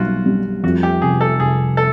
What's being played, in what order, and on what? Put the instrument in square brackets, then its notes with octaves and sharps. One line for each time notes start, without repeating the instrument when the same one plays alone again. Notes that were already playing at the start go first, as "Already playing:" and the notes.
Already playing: [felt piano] B1 G3 [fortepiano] F4 F#4
[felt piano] G3
[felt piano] F2 [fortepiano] F#4
[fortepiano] G4
[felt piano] F1 [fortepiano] G#4
[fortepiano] A4
[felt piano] F1 [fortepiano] G#4
[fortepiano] A4